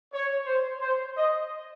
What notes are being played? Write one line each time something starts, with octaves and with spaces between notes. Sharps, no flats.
C#5
C5
C5
D#5